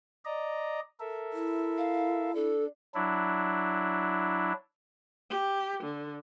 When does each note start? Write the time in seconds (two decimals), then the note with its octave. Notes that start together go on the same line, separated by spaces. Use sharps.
0.25 D5 D#5 A#5
1.00 A4 A#4 E5
1.33 E4
1.78 F5
2.35 D4 A4
2.95 F#3 D4 E4
5.30 G4
5.84 D3